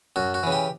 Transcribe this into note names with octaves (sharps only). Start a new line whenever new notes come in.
F#2 F#4
F#4
C#3 E3
G4